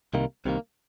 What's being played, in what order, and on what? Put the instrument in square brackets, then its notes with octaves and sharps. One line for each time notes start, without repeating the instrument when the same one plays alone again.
[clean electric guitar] C2 C3 D#3 A#3
C2 C3 D#3 A#3